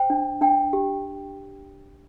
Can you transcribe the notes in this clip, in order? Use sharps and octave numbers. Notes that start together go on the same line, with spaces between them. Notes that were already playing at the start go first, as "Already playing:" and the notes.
Already playing: C5 G5
D4
D4 G5
G4